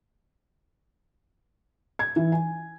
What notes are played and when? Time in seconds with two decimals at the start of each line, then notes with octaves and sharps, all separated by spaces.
1.99 G#6
2.16 E3
2.32 G#5